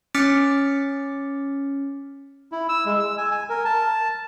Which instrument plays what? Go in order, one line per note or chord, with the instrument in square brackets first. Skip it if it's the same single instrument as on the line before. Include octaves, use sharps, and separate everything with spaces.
[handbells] C#4 D6 F6 A6 B6 C#7
[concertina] E4
E6
G#3
E6
G#5
G#5
A#4
A5